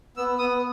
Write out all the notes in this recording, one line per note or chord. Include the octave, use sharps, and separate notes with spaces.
B3 E6
B3 D#6